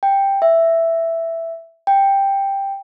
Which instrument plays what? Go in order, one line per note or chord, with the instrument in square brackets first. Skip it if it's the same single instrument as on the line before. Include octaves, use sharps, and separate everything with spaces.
[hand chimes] G5
E5
G5